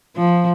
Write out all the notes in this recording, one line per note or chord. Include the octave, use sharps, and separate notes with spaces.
F3